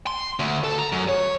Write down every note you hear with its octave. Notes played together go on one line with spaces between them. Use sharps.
C6
D2
A4
A#5
F#2
C#5